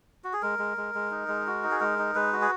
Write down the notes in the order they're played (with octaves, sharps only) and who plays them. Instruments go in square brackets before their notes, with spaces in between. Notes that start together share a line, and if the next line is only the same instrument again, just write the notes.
[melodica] F#4
G#4
G#3 A#4
G#3
G#3
G#3
D#4
G#3
F#4
D#4
G#4
G#3 A#4
D#4
G#3 B4
F#4
G#4